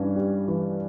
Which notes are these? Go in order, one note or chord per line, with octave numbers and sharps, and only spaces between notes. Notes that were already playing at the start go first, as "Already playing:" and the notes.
Already playing: G2 E3 C#4
G3
E3